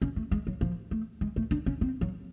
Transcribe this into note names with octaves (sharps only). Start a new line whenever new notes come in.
C#4
A3
G#3
F#3
F3
A3
G#3
A3
D4
C#4
C4
F#3